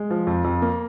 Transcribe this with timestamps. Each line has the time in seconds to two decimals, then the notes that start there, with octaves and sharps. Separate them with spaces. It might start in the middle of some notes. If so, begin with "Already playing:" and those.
Already playing: G#3
0.10 F3
0.27 F2
0.44 F2
0.62 A#3